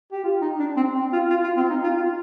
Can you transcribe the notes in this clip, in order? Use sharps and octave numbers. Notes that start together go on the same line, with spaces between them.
G4
F4
D#4
D4
C4
C4
F4
F4
F4
C4
D#4
F4
F4